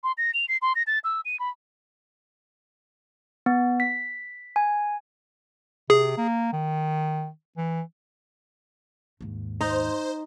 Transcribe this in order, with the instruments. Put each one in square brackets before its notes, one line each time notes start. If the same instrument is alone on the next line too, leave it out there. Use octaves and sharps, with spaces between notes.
[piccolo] C6
A#6
F7
C7
C6
A#6
A6
E6
D#7
B5
[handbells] B3
B6
G#5
[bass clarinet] C3 [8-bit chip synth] G#4
[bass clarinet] A#3
D#3
E3
[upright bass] D#2 G#2
[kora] D#4 [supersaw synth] C5